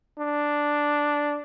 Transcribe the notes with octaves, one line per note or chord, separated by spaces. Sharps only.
D4